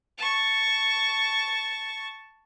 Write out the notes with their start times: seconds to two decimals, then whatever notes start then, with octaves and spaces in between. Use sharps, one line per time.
0.18 A5 C#6